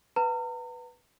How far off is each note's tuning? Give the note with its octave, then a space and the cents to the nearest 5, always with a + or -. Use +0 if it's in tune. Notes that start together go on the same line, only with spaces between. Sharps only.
B4 +0 F#5 +0 A#5 -40